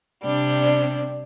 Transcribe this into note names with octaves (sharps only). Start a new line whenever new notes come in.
C3 G3 D4